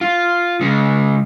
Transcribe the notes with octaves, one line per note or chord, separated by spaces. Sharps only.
F4
C#3 G#3